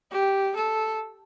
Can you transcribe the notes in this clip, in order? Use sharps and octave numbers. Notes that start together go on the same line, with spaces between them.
G4
A4